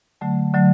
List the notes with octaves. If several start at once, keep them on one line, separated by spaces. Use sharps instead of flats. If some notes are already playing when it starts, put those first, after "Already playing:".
D3 F#3 A3 A5
D3 F#3 A3